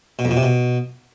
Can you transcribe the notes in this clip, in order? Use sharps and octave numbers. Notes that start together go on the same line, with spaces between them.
B2
F2
B2
C3
B2